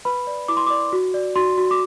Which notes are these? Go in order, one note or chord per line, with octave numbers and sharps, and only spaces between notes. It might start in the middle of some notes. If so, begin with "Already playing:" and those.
B4 B5
D5
E4 D6
C6
D5 D6
F#4
D5
F#4 C6
F#4
D6